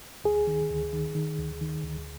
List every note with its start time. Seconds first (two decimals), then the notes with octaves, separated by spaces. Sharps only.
0.24 D2 G#4
0.47 D#3
0.70 D2
0.93 D#3
1.15 D#3
1.39 D2
1.61 D#3
1.83 D2